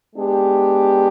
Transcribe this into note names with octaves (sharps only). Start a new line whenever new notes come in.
G#3 B3 D4 G4